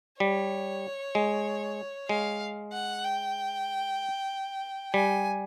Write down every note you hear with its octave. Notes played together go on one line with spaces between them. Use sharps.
G3 C#5
G#3
G#3 F5
F#5
G5
G3 G#5